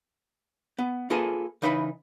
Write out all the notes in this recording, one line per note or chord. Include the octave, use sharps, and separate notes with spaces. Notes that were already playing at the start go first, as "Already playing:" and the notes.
B3
A#3 F4 G#4 A4 B4 G#5
C#3 E3 D#4 B4 F#5 B5